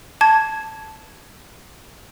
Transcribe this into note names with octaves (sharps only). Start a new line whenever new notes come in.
A5 G#6